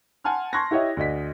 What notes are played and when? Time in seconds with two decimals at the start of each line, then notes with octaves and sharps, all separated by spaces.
0.24 F#5 G#5 A5 C6 F6
0.53 A5 C6 C#6 F#6 G#6 A#6
0.71 E4 G4 C#5 D#5 E5
0.97 D2 D5 D#5 B6